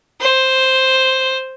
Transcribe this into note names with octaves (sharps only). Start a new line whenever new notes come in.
C5